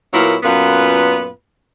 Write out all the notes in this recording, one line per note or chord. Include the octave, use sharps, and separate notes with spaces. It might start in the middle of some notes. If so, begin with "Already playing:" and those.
A#2 F#3 A#3 B3 E4
F#2 A#2 B3 F4 B4